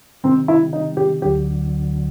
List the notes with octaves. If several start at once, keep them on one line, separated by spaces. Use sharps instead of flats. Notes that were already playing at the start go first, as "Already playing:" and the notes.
C3 D#3 G3 C4
E4
D#4
G4
D2 D3 F#3 G4